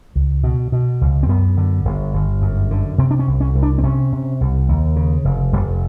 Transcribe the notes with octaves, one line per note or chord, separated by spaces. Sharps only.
C#2
B2
B2
C#2
C4
F#2 B3
D3
G1
G1
F#2
D3
C3 C4
D4
C#4
C2
C#4
C2
D4
C4
C3 C#4
C3
C2
D#2
C#3
F1
F1 G3